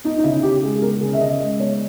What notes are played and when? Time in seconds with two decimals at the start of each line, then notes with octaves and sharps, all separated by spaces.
0.04 B3 D#4
0.18 D#4
0.24 C#3 E4
0.43 C#3 G4
0.62 G#3 G#4
0.75 G#4
0.82 B3 A#4
1.01 C#3 G#4
1.13 E5
1.20 C#3 D#5
1.40 G#3 D#5
1.60 B3 C#5